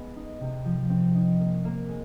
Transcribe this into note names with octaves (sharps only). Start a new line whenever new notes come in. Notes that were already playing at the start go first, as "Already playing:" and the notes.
Already playing: G#3 B3
D#4
C3
F3
C4
D#4
A#3
A#3
G#3